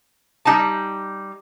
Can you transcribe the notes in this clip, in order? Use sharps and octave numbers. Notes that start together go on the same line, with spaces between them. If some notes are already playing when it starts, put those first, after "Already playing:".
G3 D#4 G#5 A5